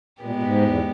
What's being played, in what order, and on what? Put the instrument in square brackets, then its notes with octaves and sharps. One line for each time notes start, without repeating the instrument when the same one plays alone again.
[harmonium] A#2 [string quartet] G#3 B3 G4
[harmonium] A#2
G#2
E2